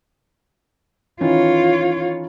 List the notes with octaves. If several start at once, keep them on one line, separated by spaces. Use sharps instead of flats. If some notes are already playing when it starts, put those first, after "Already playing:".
D#3 E3 C#4 F4 C#5